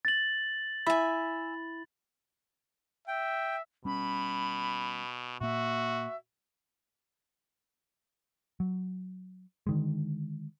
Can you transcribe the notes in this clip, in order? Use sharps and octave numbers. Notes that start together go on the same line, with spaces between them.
A6 F#7
E4 E5 G#5 B5
E5 G5
B2 G3 C#4 B5
A#2 A#3 F#4 E5
F#3
D3 D#3 G#3